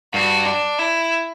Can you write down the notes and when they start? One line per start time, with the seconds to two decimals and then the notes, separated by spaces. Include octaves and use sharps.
0.14 G2 F#4
0.46 D4
0.79 E4